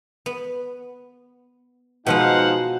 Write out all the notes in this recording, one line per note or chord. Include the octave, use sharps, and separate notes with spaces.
B3
B2 F3 G#3 B3 D#4 C5 F5 F#5